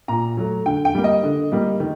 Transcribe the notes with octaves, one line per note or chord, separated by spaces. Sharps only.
A#2 A#5
F#3 A3
D3 G5
G5
G3 A#3
D#5
D3
G3 A#3
D#3